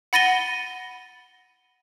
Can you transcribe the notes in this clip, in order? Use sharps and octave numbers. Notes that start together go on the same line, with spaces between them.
F#5 B5 A6 A#6 D#7 G7